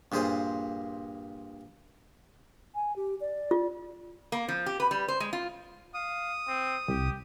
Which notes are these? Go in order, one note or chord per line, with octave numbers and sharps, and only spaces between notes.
G2 A#2 G#4 C5 F5 D#6
G#5
G4
D5
F4
A#3
F3
G4
B4
G3
C5
G#3
F4
F5 D#6
C4
C2 G4